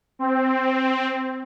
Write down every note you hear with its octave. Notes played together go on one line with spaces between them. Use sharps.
C4